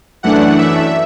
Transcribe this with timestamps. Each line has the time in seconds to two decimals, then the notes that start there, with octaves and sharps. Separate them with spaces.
0.23 F#2 E3 A3 D4 F#5
0.59 E5